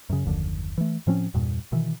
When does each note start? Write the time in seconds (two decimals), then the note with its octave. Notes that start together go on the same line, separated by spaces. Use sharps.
0.10 F#2 C#3
0.25 F#1 D#2 D3 F3
0.78 E3 A3
1.07 A2 F3 C4 C#4
1.34 E2 G2 A#2
1.72 B2 D#3 E3